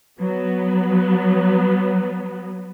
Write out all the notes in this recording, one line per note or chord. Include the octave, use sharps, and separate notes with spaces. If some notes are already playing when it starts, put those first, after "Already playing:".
F#3 B3